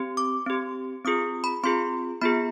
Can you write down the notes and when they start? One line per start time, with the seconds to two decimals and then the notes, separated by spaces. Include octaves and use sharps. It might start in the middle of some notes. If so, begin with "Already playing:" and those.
Already playing: C4 G4
0.17 D6
0.46 C4 G4
1.05 C4 F4 G#4 D#6
1.44 B5
1.63 C4 F4 G#4 C6
2.21 B3 F4 G#4 B5